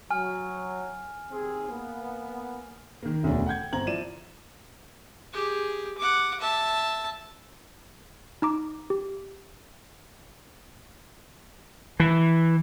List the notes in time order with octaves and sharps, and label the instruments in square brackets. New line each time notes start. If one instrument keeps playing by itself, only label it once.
[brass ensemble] F#3 [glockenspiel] G#5 F6
[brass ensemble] D#2 C4 G#4
A#3 B3
[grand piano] D#3 A#3
E1 D2 B2 C#4 D4
F#5 G5 G6 G#6
G1 C4 A#5 G#6 F#7
F3 E4 D5 D#7 E7
[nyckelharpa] G4 G#4
F#5 D6
E5 A5
[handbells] D#4 A#5 D6
G4
[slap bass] E3